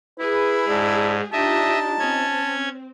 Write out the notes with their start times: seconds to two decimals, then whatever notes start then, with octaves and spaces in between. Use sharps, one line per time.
0.20 E4 G#4 B4
0.68 G#2 D4
1.33 D4 D#4 F4 G4 D#5 E5 A5
1.99 C4 C#4 G#6